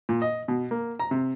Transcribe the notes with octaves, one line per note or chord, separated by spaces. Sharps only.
A#2
D#5
B2
A#3
A#5
C3